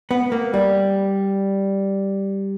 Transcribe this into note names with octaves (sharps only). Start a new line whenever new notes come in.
B3
A#3
G3